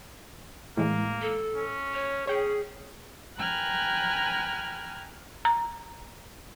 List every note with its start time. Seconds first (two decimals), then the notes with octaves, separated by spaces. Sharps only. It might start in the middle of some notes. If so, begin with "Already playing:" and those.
0.77 A2 E3 G#3 A#3
1.22 A4
1.56 C#4
1.94 C#5
2.27 C#4 G#4 C#5 G5
3.38 G5 G#5 A#5 B5 F6 F#6
5.45 A#5